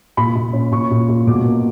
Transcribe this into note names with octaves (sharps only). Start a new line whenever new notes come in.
A#2 B5
A#2
C#4
A#2 C#6
A#2
A#2
B2 D6
A#3